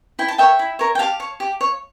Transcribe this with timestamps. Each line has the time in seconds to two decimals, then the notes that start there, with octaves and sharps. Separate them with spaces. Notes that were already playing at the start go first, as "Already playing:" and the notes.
0.19 E4 G5
0.28 A5
0.38 A#4 C#5 E5 G5
0.59 E4
0.79 A#4 C#5
0.95 G5
0.99 G4 F5 A5
1.20 C#5
1.40 G4
1.61 C#5